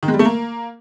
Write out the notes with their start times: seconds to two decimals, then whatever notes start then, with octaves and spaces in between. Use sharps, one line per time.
0.03 D#3
0.08 G#3
0.14 G3
0.19 A3
0.25 A#3